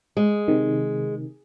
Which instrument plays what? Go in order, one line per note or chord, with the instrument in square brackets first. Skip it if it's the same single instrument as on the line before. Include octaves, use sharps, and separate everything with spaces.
[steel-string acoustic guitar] G#3
[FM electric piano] C3 D#3